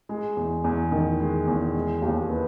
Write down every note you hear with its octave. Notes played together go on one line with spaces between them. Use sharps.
G#3
E2
E2
D#3
G#3
E2
G#3
D#2
B3